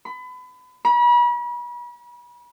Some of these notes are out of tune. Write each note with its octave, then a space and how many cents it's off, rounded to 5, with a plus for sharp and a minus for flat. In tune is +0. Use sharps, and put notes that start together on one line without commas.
B5 +30
B5 -40